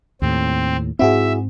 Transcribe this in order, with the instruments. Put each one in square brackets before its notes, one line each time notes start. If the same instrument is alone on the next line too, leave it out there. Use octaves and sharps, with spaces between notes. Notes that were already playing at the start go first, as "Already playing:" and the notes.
[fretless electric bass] D#2 A2 [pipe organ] C4
[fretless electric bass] G#2 C4 [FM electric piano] E4 F#4 G#4 [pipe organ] E5